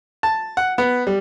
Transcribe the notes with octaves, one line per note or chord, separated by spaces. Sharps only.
A5
F#5
B3
G3